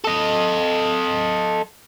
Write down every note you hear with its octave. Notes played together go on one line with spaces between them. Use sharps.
A4 D#5